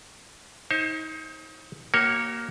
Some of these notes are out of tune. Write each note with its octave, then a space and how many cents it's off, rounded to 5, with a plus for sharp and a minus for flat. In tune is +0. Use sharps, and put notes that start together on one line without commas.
D#4 +30 C5 +40
A#3 +0 F#4 +40 C#5 -10